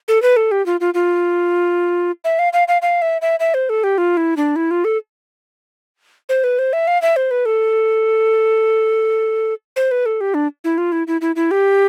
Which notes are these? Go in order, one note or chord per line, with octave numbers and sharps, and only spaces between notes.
A4
B4
A4
G4
F4
F4
F4
E5
F5
F5
F5
F5
E5
E5
E5
C5
A4
G4
F4
E4
D4
E4
F4
A4
C5
B4
C5
E5
F5
E5
C5
B4
A4
C5
B4
A4
G4
D4
E4
F4
E4
E4
E4
E4
G4